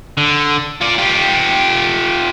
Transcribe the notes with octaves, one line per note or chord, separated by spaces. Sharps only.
D3
F4 D5
F4 G4